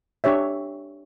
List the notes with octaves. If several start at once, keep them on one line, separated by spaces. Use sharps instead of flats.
D4 G4 C#5 E5